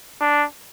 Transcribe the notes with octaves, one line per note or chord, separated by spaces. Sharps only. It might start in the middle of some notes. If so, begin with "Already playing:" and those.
D4